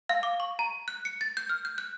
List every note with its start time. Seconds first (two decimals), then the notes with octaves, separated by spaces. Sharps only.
0.09 F5
0.23 D6
0.40 C#6
0.59 A#5
0.88 F#6
1.05 C#7
1.21 A6
1.37 G6
1.49 F6
1.65 G6
1.78 F#6